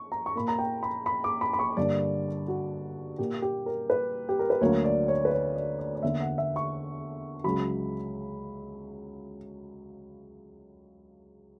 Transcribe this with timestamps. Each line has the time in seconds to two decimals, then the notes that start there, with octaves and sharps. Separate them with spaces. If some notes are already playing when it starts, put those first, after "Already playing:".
Already playing: C#6
0.12 A#5
0.26 C#6
0.35 A#2 A#3 B5
0.48 A#5
0.58 G5
0.83 B5
1.06 B5
1.24 D6
1.41 B5
1.53 B5
1.59 C#6
1.77 G2 D3 A#3 D5
2.48 F#4
3.19 A#2 A#3 G4
3.42 G4
3.66 A#4
3.90 B4
4.29 G4
4.39 A#4
4.50 B4
4.61 D2 D3 F#3 A#3 C#5
4.84 D5
5.08 C#5
5.25 B4
5.32 C#5
5.56 D5
5.79 D5
5.95 D5
6.03 E2 D3 A#3 E5
6.21 F#5
6.38 E5
6.56 C#6
7.44 C#2 C#3 F#3 B5